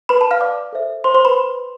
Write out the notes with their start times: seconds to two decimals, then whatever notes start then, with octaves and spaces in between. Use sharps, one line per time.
0.09 B4 B5
0.21 A5
0.31 F5 F6
0.41 D5 D6
0.73 A4 C5 E5
1.04 C5 C6
1.14 C5 C6
1.25 B4 B5